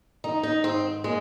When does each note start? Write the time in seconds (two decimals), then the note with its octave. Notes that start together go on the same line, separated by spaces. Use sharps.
0.24 D#3 D#4
0.44 D#4
0.64 G#2 C4
1.04 G#3 A#3